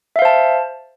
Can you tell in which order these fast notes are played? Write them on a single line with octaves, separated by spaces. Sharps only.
E5 F5 C5 A5